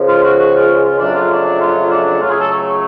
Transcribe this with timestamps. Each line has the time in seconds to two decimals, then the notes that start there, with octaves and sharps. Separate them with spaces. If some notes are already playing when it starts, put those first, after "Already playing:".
Already playing: C#2 C#3 F3
0.09 F4
0.23 F#4
0.39 F#4
0.54 F4
0.84 F4
0.99 F2 C#3 F#3 A3 D4
1.15 F4
1.30 D4
1.44 D4
1.60 F4
1.91 D4
2.05 D4
2.20 C#2 C#3 F#3 A3 F4
2.30 G#4
2.40 A4
2.51 C#5
2.66 C#5